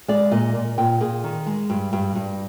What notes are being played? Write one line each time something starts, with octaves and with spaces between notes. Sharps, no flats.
G#3 D5
A#2 D#5
A#2
A#2 G5
A#2 G#4
D#3
G#3
G2
G2
G2